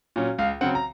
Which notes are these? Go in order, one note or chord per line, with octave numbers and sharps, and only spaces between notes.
A#2 F#3 C#4
C#2 F5
C#3 F#3 C4 F#5
A#5